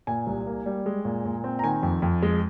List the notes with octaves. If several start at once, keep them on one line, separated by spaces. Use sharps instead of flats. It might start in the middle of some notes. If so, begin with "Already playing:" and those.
A#2 G#5
C2
A#3
G3
G#3
A#2
A#2
C4
A#5
D#3 G#5
F2
F2
G#3